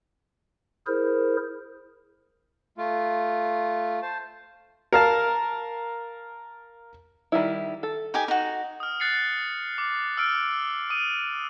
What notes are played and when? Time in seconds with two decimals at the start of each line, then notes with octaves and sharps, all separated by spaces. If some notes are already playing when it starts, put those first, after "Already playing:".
0.86 E4 G#4 A#4 C5
2.78 A3 F4
4.02 C5 A5
4.93 A#4 F5 A5
7.32 D#3 G3 E4
7.83 A4
8.14 D#4 G4 G#5
8.28 D#4 F#4
8.80 D#6 F6
9.00 F#6 A6 C7 C#7
9.78 D6
10.17 E6 F6 D7
10.90 D#6 D#7